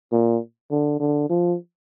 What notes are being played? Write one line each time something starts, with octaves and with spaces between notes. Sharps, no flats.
A#2
D3
D3
F3